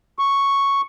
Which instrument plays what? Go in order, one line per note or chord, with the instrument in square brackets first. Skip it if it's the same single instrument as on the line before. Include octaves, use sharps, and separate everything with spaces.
[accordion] C#6